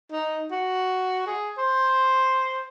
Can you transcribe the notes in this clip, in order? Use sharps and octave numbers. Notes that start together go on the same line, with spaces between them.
D#4
F#4
G#4
C5